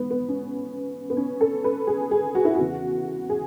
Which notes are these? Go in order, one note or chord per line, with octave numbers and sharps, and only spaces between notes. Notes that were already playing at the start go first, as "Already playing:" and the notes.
Already playing: G#2 E3 B3
B3
C#4
B3
C#4
A4
B4
G#4
G#4
F#4
E4
E2 C#3 E3 F#4
G#4